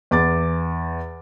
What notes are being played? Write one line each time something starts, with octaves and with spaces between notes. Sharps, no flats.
E2 D6 A6